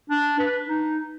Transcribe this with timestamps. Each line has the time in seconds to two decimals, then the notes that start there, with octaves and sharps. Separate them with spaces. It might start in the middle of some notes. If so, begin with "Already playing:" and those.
0.10 D4
0.39 B4
0.67 D#4